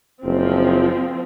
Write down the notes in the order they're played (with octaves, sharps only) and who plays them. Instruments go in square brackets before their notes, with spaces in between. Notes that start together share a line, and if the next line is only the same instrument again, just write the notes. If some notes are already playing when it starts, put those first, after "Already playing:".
[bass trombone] F#1 [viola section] F3 C4